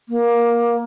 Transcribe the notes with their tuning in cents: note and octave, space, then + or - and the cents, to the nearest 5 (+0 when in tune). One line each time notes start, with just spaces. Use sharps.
A#3 +15